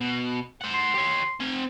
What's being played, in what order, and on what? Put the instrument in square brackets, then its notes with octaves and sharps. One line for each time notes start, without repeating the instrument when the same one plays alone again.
[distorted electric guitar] B2
C5 F#5
[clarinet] C6
[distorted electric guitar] G4 C#5
C4 G#5